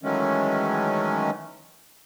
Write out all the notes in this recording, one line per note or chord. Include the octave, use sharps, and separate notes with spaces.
D#3 E3 F#3 G#3 A3 C#4